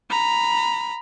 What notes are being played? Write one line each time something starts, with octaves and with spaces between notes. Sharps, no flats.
A#5 B5